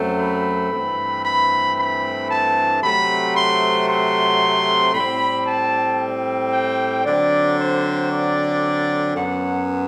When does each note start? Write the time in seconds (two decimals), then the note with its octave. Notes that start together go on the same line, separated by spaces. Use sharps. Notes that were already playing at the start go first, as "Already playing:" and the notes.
Already playing: F#2 F#3 A3 C4
0.19 B5
0.72 G2 E3 A3 C4
1.25 B5
1.77 B5
2.30 A5
2.83 C3 F#3 A3 C4 B5
3.36 C6
3.89 C6
4.94 A2 G3 C4 B5
5.47 A5
6.52 G5
7.05 D3 F#3 C4 D5
7.58 C5
8.11 D5
9.16 F#2 F#3 B3 F#5